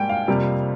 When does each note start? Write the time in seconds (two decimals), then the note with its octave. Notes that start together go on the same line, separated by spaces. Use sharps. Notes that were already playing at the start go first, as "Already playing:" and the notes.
Already playing: G#2 G3 A#3 G5 G#5
0.09 F5
0.28 F2 C3 G3 A#3